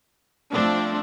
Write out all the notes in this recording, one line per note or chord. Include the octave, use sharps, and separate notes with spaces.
F3 A3 C4 D4